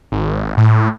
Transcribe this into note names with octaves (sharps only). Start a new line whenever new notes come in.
G#1
A2